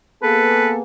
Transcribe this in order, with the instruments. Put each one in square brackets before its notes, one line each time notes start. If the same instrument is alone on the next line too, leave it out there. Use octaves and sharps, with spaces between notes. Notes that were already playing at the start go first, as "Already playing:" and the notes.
[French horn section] A#3 B3 G#4 [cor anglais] A4 [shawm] B4